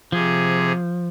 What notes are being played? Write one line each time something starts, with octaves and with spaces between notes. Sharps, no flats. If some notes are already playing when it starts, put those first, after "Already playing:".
C3 F3 G#4